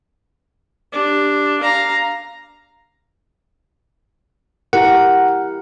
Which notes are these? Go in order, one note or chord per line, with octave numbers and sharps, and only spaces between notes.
D4 G4
F5 A#5
E4 G4 A#4 F#5